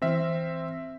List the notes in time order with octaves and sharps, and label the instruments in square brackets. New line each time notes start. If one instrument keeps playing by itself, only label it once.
[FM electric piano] E3 F6 A#6 [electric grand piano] C4 E5